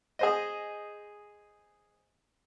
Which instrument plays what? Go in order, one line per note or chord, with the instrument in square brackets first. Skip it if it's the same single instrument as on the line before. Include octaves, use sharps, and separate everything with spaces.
[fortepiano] G#4 C5 D#5